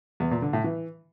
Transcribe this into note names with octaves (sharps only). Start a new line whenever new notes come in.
E2
A#2
D3
A2
E3